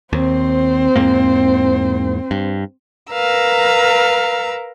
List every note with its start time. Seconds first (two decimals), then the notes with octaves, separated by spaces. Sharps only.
0.13 D#2 C4 C5
0.96 E2 G#2 A#3
2.31 G2
3.12 A#4 B4 F5 A#5 E6